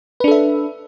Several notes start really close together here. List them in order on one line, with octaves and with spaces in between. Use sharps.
B4 D4 A4 E5